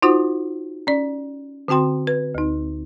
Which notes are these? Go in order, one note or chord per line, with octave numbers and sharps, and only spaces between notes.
D#4 F4 F#4 C5 F#5 D#6
C#4 D5
D3 C4 F#4 G5 C6
B4
D2 D#4